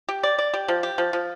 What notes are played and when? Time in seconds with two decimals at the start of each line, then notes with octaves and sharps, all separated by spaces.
0.09 G4
0.23 D5
0.38 D5
0.54 G4
0.68 F3
0.83 G4
0.98 F3
1.13 F3